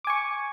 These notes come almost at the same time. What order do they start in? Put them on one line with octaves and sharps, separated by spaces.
D6 G#5 C#6